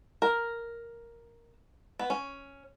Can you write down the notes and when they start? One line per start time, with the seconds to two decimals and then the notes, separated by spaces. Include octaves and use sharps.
0.22 A#4
1.99 B3
2.10 C#4